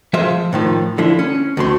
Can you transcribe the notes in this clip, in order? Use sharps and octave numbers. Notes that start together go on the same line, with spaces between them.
F3 G#3 C5 E5 F5
A2 D#3 F3
D3 F3 E4
C#4
D2 A3 C6